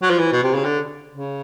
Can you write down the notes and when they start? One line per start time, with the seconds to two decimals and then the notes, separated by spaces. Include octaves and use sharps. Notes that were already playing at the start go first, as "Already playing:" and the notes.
0.02 F#3
0.10 F3
0.18 E3
0.33 B2
0.43 C3
0.54 C#3
0.65 D3
1.12 C#3